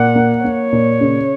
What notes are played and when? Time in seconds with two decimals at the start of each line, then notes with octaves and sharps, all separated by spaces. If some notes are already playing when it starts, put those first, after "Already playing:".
Already playing: A#2 F#5
0.15 A#3
0.44 A#3 C#5
0.72 A#2
1.01 C#3